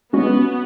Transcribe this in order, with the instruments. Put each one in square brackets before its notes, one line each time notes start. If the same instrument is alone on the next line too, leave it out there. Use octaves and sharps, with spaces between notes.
[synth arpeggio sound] G#3 C#4 F#4 [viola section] B3